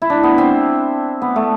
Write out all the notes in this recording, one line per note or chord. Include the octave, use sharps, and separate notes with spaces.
E4
D4
B3
C4
B3
A3